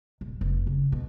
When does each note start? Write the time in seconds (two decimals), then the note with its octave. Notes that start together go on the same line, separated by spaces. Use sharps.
0.21 D#1
0.41 F1
0.67 C#3
0.92 B2